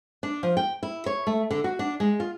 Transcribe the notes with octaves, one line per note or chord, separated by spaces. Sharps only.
D4
F3
G5
E4
C#5
A3
D3
F#4
D4
G#3
F4